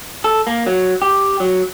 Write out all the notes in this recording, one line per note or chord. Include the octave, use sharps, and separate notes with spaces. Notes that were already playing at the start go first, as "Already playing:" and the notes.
A4
A#3
F#3
G4
F#3